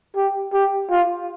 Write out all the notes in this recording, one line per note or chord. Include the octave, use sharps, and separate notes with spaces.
G4
G4
F4